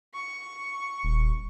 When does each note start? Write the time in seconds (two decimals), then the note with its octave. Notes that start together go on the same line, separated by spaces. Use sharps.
0.14 C#6
1.03 D#1